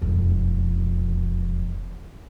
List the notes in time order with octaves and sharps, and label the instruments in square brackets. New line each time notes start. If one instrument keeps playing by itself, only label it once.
[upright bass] E1 F2